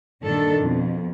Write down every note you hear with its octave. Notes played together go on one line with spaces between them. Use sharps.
G2 A#2 D#3 D4 A4
F2 B2